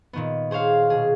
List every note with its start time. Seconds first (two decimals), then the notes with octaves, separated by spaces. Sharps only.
0.13 A#2 D#3 B3
0.51 G#4 C5 C#5 F5
0.90 B2 G#4